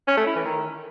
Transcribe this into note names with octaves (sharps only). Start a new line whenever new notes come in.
C#4
A3
E4
E3
D#3